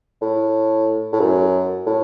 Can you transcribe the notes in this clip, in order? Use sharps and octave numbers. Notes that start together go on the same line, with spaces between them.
A2
A2
F#2
A2